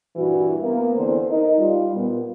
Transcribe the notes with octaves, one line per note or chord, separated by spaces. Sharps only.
G2 A#2 E3 E4 F#4
A#3 B3
E2 D3 C4 A4 C5
D#4 A#4 D#5
G3 F4
A#2 B3